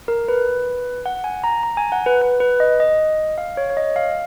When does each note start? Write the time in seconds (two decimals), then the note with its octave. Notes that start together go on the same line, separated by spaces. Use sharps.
0.08 A#4
0.28 B4
1.06 F#5
1.24 G#5
1.44 A#5
1.63 A#5
1.77 G#5
1.92 F#5
2.06 B4
2.22 B4
2.40 B4
2.60 D#5
2.80 D#5
3.38 F5
3.57 C#5
3.70 C#5
3.77 D#5
3.96 F5